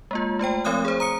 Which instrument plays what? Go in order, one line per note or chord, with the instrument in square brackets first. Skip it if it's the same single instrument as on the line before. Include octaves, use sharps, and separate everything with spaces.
[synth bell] G#3 A#3 F4
A3 F4 C5 G5
F3 A3 C4 C#5 D#6 F#6
G#4 C5
A#5 D#6 C#7